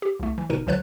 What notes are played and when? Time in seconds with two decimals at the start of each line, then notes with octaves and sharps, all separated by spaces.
0.02 G4
0.20 C2 A3
0.38 E3
0.50 G1 B2 D#4 A#4 D#7
0.66 C#2 D3 F#3 B4 C#5 F#6